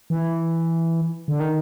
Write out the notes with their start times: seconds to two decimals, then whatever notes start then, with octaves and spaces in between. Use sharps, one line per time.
0.10 E3
1.28 D3
1.40 D#3